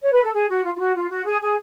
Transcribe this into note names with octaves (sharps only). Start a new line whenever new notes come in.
C#5
B4
A4
G#4
F#4
F4
F4
F#4
F4
F#4
G#4
G#4